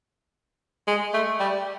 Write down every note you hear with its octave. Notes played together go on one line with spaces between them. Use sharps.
G#3
A3
G3